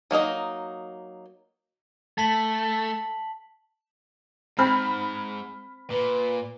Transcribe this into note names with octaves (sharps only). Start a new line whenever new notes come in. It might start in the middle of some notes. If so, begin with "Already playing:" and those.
F#3 A#3 D#4 D#5
A3 A5 B6 F#7
G#2 C4 B5 F6
A#2 B4